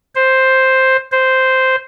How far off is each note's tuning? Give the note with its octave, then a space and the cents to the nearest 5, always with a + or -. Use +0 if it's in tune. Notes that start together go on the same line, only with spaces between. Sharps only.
C5 +5
C5 -5